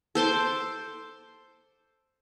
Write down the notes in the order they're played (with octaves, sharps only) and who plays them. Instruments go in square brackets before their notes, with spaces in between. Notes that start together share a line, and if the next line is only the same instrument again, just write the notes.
[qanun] A4 C5 C6 D6